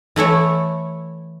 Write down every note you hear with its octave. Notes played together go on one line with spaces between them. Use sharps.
E3 A3 E4 C#5